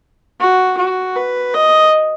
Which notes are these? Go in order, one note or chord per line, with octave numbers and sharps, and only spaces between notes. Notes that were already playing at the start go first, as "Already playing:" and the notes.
F#4
F#4
B4
D#5